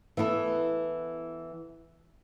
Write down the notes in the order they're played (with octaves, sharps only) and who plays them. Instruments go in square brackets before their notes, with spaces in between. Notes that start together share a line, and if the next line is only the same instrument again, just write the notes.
[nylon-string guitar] E3 B3 E4 A4